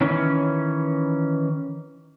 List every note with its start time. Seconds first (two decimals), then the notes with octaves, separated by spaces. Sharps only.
0.01 D#3 E3 C#4